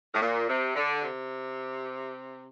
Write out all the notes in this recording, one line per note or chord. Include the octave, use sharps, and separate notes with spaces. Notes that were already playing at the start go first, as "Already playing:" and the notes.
A2
A#2
C3
D3
C3